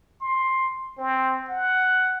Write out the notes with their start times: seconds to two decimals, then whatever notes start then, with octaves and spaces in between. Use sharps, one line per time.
0.21 C6
0.98 C4
1.48 F#5